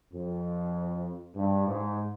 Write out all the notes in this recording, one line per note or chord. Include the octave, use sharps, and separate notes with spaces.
F2
G2
G#2